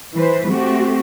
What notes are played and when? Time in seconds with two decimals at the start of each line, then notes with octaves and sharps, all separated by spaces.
0.15 E3 B4 C5
0.50 A3 C4 F#4 G4